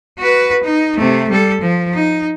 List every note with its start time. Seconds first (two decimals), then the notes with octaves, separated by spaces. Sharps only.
0.19 F#4 B4
0.63 D#4
0.97 C3 A3
1.30 G3 A4
1.61 F3
1.94 D#4